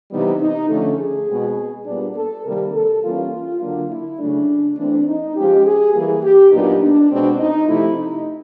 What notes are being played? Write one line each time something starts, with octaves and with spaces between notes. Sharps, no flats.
C3 E3 G3 B3 D#4
D#4
D3 F3 A3 C#4 A4
G#4
B2 G#3 C4
A#2 G3 B3 D4
A4
C3 D#3 G3 A#3 A#4
A4
E3 G3 A#3 C#4 F4
F4
D3 F#3 A#3 D4 F4
E4
C#3 F#3 A3 D4
E3 A3 C4 D4
D#4
F3 G#3 C#4 G4
G#4
E3 G3 A#3 G#4
G4
A#2 F#3 B3 D4 D#4
D4
B2 G#3 C4 D4
D#4
C3 F3 A3 E4
D#4